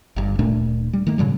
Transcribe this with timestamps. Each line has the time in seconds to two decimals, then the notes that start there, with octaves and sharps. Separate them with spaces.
0.16 G1 G2
0.39 D1 A#2 A3 D4
0.93 G3
1.07 D#3 A3 A#3
1.18 A2 C#3 F#3 G3